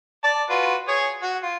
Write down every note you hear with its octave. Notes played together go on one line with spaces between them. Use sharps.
D5 A5
F4 F#4 B4
G#4 C#5
F#4
F4